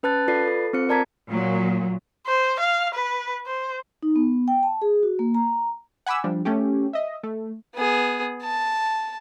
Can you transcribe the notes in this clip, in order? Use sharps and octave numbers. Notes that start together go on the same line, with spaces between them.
C#4 B4 A5 F#6 A6
F4 A4 B4 D5 A6 C7
A4
C4 F4 C5 C#7
A#4 D5 A5 A#5 G#6 B6
A#2 F#3
C5
F5
B4
C5
D#4
B3
G5
A5
G#4
F#4
A#3
A#5
F#5 G#5 B5 D6 E6
F3 G3 D4
A3 C#4 G4
D#5 E5
A3
B3 G#4
A5